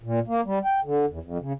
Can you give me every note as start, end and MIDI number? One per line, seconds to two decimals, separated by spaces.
0.03 0.20 46
0.27 0.41 58
0.45 0.59 55
0.65 0.80 79
0.84 1.06 50
1.09 1.19 40
1.23 1.38 41
1.40 1.53 49